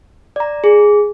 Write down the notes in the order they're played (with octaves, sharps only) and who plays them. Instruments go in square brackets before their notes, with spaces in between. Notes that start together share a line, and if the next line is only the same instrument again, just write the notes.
[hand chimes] D5 A#5
G#4